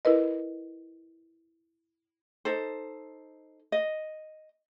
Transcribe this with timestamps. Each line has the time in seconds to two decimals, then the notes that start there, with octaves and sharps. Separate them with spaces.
0.05 E4 A#4 B4 D#5
2.45 D#4 A4 C5
3.72 D#5